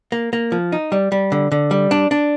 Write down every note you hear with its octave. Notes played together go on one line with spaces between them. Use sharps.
A#3
A#3
F3
D#4
G3
G3
D3
D3
G3
D4
D4